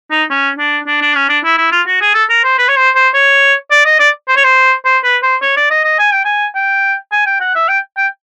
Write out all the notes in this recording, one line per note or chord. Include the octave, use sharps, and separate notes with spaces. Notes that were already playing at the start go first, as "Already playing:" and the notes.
D#4
C#4
D4
D4
D4
C#4
D4
E4
E4
F4
F#4
G#4
A4
A#4
C5
B4
C#5
C5
C5
C#5
D5
D#5
D5
C5
C#5
C5
C5
B4
C5
C#5
D5
D#5
D#5
G#5
G5
G#5
G5
G#5
G5
F#5
E5
G5
G5